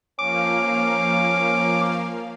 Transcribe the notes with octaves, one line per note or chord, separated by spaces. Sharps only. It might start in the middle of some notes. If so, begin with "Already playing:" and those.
F3 A#3 C#4 F5 D6